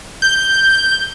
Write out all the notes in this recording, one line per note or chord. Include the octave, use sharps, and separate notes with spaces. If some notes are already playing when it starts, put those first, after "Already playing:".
G6